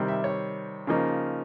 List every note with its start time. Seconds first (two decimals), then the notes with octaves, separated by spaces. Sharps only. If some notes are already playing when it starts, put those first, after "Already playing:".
Already playing: C3 D#3 G3
0.08 E5
0.24 C#5
0.87 C#3 F3 A#3 D#4